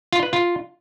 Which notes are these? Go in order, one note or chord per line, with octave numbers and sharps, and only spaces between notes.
F4
B4
F4